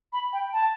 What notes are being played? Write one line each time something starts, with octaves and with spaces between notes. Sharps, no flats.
B5
G5
A5